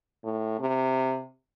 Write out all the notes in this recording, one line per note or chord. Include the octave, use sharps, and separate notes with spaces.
A2
C3